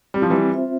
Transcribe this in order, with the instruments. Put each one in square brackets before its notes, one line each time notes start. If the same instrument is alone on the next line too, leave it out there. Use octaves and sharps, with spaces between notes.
[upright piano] G3 [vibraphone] C4
[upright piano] F3
E3 G3
[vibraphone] F4 C5 E5